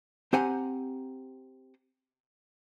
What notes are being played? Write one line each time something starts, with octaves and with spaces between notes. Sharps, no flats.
C4 G4 C5 F#5 G#5 A#5